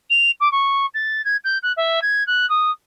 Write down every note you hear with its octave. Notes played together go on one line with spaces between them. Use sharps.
F7
D6
C#6
A6
G#6
G6
F#6
E5
G#6
F#6
D#6